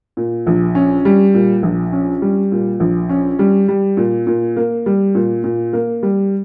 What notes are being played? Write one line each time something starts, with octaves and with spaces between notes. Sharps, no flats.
A#2
A#1
C#4
G3
A#2
A#1
C#4
G3
A#2
A#1
C#4
G3
G3
A#2
A#2
A#3
G3
A#2
A#2
A#3
G3